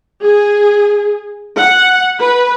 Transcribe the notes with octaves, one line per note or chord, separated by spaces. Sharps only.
G#4
F#5
B4